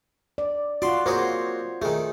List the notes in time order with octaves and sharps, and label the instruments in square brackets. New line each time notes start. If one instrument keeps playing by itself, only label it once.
[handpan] D5
[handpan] F4 F#4 [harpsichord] D5 C6
[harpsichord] A#3 F#4 G#4 [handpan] C5 C#5
[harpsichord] D#3 A3 [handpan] G#4